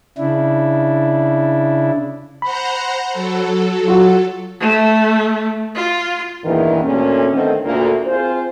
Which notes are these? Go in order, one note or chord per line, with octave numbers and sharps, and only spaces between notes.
C#3 D4 E4
C5 F#5 A#5 B5
F#3 A4
F4 F#4
A3
F4
E2 G2 A#2 D#3 E3
D2 A#2 A3 C#4
D3 D#3 A3 B3 C4
D2 A#2 A#3
C4 F4 G#4 C5